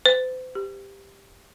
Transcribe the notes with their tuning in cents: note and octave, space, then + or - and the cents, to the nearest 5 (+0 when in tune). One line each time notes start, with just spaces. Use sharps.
C5 -40
G4 +10